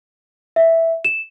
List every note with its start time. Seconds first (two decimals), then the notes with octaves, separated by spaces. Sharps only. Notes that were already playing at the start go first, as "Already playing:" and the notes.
0.56 E5
1.05 E7